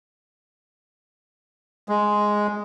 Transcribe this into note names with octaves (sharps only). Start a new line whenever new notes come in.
G#3